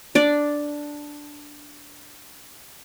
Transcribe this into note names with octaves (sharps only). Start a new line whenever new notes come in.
D4 D5